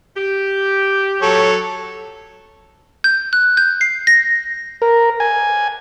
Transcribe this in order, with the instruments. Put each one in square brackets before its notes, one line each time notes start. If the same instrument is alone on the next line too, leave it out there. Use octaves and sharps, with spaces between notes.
[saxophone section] G4
[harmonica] F#3 A4 C#5
[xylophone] G6
F#6
G6
C7
A#6
[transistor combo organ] A#4
G#5